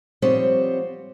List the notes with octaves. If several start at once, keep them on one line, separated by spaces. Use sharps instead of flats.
F3 G3 B3 C4 C5 C#5